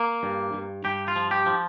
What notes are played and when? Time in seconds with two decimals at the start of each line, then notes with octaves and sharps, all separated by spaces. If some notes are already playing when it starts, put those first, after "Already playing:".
Already playing: A#3
0.23 G2
0.54 G2
0.85 G2 G4
1.08 F4
1.16 F3
1.31 G4
1.46 F3